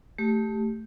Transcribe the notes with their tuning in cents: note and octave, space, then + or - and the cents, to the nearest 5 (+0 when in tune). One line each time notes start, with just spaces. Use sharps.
A3 +0 G4 +0